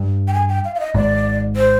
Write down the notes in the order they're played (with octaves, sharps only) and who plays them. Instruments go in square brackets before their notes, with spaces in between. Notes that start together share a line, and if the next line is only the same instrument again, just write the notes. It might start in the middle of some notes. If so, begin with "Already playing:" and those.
Already playing: [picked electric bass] G2
[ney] G5
G#5
G5
F5
F5
D#5
[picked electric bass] G#1 G#2 [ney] D5
[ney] C5